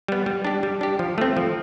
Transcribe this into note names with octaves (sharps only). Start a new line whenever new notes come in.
G3 B3
G3
D4 G4
G3
D4 G4
F3
A3 C4
F3